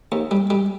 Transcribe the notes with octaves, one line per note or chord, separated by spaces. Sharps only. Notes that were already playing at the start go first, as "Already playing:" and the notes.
D#2
G3
G3